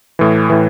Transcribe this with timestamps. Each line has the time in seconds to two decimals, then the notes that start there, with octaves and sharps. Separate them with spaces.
0.19 A2 E3
0.50 A2 E3